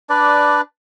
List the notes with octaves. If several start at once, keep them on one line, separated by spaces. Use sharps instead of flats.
D4 B4 D5